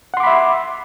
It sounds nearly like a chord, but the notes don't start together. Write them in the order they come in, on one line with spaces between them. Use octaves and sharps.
F#5 C6 D6 B5 E5